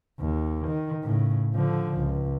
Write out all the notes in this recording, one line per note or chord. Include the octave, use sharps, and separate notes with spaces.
D#2
D#3
A2 C#3
D3 F3
C#2